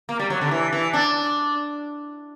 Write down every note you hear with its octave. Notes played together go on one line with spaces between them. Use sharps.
A#3
G3
F#3
D3
E3
E3
D4